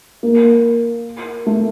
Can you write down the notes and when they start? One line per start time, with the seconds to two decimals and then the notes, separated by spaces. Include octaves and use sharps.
0.23 A#3
1.46 A3